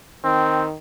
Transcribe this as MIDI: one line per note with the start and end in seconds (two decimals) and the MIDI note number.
0.24 0.75 51
0.24 0.65 60